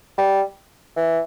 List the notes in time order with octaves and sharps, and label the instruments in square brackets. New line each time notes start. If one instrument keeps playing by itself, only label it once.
[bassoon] G3
E3